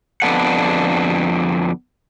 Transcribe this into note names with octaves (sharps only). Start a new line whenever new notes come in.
F2 D3 F3 B3 D4 F#5